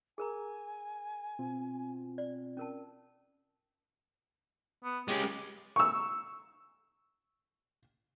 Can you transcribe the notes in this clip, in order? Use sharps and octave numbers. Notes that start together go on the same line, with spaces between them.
G#4 A#4 G#5 A#5
B2 C4 F4
D5
C#4 A#4 A5
B3
G#3 C#4 G4
C#6 E6